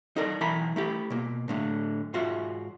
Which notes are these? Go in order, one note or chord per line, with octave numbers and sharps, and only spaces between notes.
D#4 A4 A#4 D5
B1 E3 E4 G#5 A#5 B5
A3 E4 G4
B2 A#3
A2 D3 A3
G#2 F4 F#4 E5